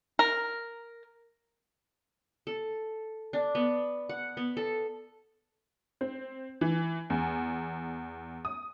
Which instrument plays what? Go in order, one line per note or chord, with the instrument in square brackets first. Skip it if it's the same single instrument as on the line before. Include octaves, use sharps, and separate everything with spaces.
[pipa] A#4
[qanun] A4
D4
B3
F#5
B3
A4
[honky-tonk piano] C4
E3
E2
D#6